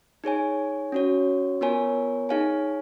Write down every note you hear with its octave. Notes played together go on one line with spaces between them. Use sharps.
D#4 G#4 C#5 G#5
C#4 F#4 C#5
B3 F4 A#4 C#5 G#5
D#4 G#4 C#5 F5 G#5